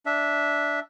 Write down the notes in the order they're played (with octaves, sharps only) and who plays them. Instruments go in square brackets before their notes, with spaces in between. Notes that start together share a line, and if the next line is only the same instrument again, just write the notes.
[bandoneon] D4 E5